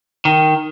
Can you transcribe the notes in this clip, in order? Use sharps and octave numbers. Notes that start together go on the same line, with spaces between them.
D#3